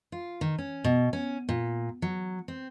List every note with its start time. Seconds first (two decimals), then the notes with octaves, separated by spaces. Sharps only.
0.12 F4
0.41 D#3
0.58 C#4
0.84 B2
1.13 C#4
1.49 A#2
2.02 F#3
2.48 C4